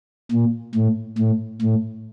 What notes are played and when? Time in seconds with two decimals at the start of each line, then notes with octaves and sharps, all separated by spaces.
0.32 A#2
0.75 A2
1.18 A2
1.62 A2